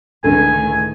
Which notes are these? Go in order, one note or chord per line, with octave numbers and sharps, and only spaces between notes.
C#2 A2 D3 D#3 A4 G#5